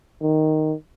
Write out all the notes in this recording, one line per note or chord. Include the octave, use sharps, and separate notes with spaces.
D#3